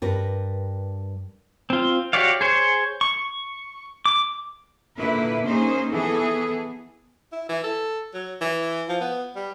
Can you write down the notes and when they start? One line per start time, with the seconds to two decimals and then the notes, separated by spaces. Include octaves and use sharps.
0.02 G2 A#4 B4
1.70 C4 F4
2.13 F#4 G4 C#5 D5 F5
2.41 G#4 C5 C#5
3.01 C#6
4.06 D6
4.98 A#2 D3 A#3 E4 B4
5.46 A#3 C#4 D#4 G#4 C5
5.90 E3 B3 G#4 A4
7.32 E4
7.49 E3
7.64 A4
8.14 F#3
8.41 E3
8.89 F3
9.01 B3
9.35 G3